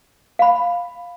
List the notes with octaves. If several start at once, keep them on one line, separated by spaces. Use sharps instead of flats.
F5 B5